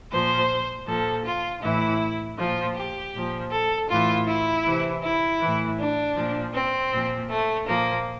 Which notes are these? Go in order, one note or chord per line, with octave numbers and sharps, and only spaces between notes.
A#2 F3 C5
A#2 F3 A4
F4
A2 E3 E4
A#2 F3 F4
G4
A#2 F3
A4
A2 E3 F4
E4
C3 E3
E4
A2 E3
D4
A#2 F3
C4
A#2 F3
A3
A#2 F3 A#3